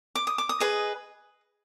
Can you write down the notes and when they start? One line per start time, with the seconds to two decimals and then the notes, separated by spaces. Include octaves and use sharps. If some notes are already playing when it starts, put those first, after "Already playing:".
0.15 D6
0.27 D#6
0.38 D6
0.49 D#6
0.60 G#4 B4 D#5